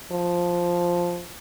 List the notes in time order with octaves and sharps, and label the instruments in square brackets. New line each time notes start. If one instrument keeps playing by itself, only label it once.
[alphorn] F3